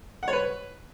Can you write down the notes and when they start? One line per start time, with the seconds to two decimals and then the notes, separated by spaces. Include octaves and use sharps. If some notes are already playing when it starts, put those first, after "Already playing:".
0.23 F#5
0.28 C#5
0.33 B4